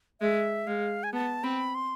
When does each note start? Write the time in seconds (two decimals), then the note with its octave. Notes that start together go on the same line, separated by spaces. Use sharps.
0.21 G#3 E5
0.67 G#3 F5
1.04 G#5
1.13 B3 A5
1.43 C4 B5
1.75 C6